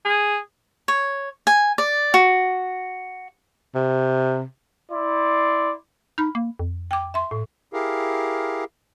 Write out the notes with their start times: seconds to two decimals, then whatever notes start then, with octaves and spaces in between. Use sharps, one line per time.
0.05 G#4
0.88 C#5
1.47 G#5
1.78 D5
2.14 F#4
3.75 C3
4.92 E4 D5 C6
6.18 D#4 B5 F6
6.35 A#3
6.59 F2
6.91 G5 D6
7.14 E5 C6
7.31 A2
7.73 E4 G4 G#4 A#4 F5